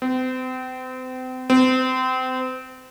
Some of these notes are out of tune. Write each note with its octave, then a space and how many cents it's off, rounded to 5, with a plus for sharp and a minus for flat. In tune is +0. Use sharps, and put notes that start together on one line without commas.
C4 -35
C4 -30